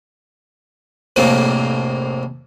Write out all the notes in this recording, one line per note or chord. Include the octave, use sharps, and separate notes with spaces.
A#1 F2 A2 C3 A#3